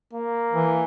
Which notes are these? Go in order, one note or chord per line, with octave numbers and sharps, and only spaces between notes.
A#3
E3